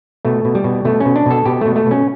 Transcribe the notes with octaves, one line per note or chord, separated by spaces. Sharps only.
B2 A3
B2
G3
B2
B2 A3
C#4
B2
D4
B2 A4
B2 G4
B2 A3
A3
B2 C#4